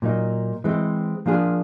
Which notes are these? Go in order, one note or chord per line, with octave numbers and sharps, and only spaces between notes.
A#2 F#3 A#3 D#4
E3 G#3 C4
F3 A#3 D4 F4 G#4